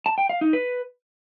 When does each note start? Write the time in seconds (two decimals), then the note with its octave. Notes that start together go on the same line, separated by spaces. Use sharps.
0.06 A5
0.18 G5
0.29 F5
0.41 D#4
0.53 B4